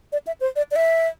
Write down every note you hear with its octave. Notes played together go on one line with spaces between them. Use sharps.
D5
E5
C5
D5
D5
E5